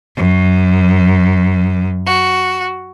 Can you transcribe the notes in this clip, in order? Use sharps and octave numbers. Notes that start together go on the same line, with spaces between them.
F#2
F#4